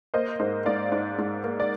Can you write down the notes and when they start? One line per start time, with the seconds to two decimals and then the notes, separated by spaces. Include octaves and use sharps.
0.14 A#3 C5 D#5
0.39 G#2 C5 D#5
0.66 G#2 D5 F5
0.92 G#2
1.18 G#2
1.44 A#3
1.60 D5